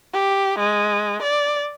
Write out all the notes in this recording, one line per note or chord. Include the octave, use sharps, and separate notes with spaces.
G4
G#3
D5